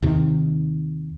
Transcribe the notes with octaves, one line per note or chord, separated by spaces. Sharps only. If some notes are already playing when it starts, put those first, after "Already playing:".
D#2 C3 D#3